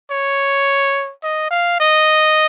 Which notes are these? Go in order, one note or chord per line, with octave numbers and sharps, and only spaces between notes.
C#5
D#5
F5
D#5